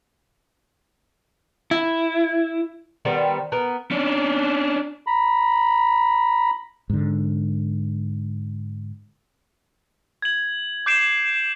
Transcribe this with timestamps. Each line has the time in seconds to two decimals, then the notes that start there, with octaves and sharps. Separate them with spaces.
1.71 E4
3.05 D#3 G3 B3 C5
3.52 B3 A#4
3.91 C#4 D4
5.07 A#5 B5
6.90 G#2 D3
10.22 G#6 F#7
10.86 D6 G6 C7 D7 E7